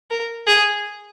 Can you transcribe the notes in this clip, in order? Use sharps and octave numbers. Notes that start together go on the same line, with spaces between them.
A#4
G#4